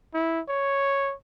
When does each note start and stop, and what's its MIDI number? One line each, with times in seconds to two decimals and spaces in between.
0.14 0.40 64
0.49 1.14 73